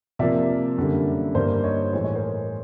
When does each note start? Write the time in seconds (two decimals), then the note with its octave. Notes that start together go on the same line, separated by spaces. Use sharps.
0.19 C3 F3 A#3 D5 E5
0.77 F#2 D3 G3 A#3
1.35 G2 D#3 G3 A#3 C5 D5
1.64 C#5 D#5
1.93 A2 E3 G#3 C5
2.04 C#5
2.15 A#4 C5